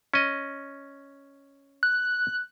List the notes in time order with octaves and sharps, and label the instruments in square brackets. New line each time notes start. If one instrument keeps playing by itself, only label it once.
[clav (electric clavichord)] C#4 D#5
[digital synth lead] F#6